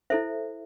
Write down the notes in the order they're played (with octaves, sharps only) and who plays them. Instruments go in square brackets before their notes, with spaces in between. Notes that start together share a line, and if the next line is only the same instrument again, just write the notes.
[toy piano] E4 A4 C5 E5